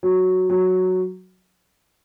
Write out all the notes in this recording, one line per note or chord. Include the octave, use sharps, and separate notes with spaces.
F#3
F#3